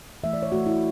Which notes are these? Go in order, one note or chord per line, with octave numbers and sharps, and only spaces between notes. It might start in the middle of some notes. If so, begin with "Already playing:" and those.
E3 A3 E5
D5
C#5
E3 A3 F#4
E4